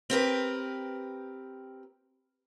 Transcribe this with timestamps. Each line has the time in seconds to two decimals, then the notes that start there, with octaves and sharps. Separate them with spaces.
0.10 C4 G4 A#4 B4